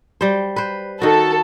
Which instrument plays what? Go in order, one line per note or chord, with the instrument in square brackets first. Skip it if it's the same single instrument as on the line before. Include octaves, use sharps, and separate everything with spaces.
[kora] G3 C5
B4 C5
[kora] D#3 F#4 [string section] A4